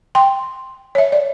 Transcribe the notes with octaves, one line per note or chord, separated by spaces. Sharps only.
G5 C6
C#5 E5
D5